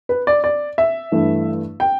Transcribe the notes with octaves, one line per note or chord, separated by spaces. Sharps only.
B4
D5
D5
E5
G2 E3 A3 E4
G5